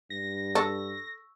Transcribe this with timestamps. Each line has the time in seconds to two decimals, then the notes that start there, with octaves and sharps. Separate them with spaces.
0.10 G2 A#6
0.55 A4 C#6 E6